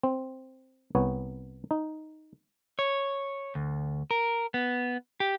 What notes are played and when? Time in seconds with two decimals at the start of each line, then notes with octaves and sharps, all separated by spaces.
0.03 C4
0.95 C2 B3 C#5
1.71 D#4
2.79 C#5
3.55 D2
4.11 A#4
4.54 B3
5.20 G4